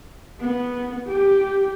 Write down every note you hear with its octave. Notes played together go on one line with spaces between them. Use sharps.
B3
G4